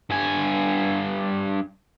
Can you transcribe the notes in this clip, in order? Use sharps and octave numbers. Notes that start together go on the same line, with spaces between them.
G2 G#5